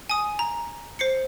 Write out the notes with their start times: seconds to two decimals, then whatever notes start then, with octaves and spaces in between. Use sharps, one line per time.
0.10 G#5 D#6
0.39 A#5
0.99 C5 C7 C#7